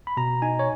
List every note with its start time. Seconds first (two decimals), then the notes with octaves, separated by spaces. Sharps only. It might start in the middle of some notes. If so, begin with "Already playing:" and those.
0.07 B5
0.17 B2 A#5
0.42 D#4 G#5
0.59 C#5